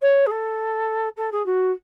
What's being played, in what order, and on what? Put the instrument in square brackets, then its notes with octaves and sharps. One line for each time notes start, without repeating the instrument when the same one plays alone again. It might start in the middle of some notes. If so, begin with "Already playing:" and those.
[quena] C#5
G#4
A4
A4
G#4
F#4